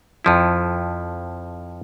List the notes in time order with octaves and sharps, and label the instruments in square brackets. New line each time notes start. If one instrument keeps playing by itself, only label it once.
[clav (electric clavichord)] F2 F3 E4